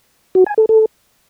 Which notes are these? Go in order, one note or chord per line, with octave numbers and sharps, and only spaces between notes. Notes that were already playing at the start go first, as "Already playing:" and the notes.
F#4
G#5
A4
A4